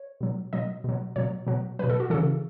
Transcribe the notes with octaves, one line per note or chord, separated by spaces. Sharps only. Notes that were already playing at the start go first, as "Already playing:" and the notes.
Already playing: C#5
B2 F#3
B2 F#3 D#5
B2 F#3
B2 F#3 C#5
B2 F#3
B2 F#3 B4
A4
F#4
C#3 E3 A4